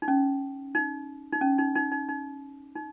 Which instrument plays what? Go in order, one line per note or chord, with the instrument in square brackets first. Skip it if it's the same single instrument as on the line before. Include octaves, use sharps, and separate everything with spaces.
[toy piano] D#4
C#4
D#4
D#4
C#4
D#4
D#4
D#4
D#4
D#4